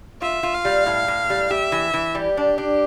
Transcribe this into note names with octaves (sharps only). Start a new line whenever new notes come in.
F4 E5
F4
F5
G3
A2
A2
G3
G4 E5
E3
E3
G3 G4
D4
D4